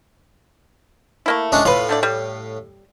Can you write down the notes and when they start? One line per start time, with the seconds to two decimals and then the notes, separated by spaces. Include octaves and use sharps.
1.26 A3 A#3 E4
1.52 G#3 C#4 D4
1.65 A2 F4 B4 F5
1.89 D3 A3 D5
2.03 G3